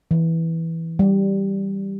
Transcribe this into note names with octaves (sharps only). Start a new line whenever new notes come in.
E3
G3